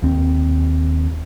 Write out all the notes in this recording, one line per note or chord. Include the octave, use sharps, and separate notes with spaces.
D#2 C4